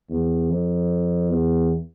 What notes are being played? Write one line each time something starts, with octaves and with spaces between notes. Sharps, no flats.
E2
F2
E2